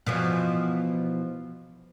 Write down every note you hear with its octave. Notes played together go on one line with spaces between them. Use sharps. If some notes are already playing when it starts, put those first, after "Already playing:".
B2 E3 F3